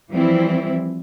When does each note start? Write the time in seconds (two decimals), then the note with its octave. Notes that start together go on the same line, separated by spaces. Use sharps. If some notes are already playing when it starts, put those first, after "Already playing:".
0.11 E3 F3 G3 C4 E4